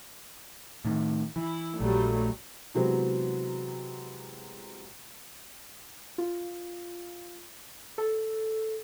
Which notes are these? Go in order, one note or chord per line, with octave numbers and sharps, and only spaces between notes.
A2 D#3
E3 E4
A#1 F#3 G3 A3
C3 E3 F#3 G#3 B3 C4
F4
A4